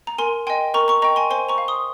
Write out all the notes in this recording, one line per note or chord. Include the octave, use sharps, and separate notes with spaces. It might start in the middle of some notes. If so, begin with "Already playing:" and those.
A#5
A#4 G#5 C6
D#5 G5 G#5 C6
A#4 A#5 C#6
A#5 C#6
D#5 G5 A#5 C#6
G#5 C6
C5 G#5 C6
A#5 C#6
F5
C6 D#6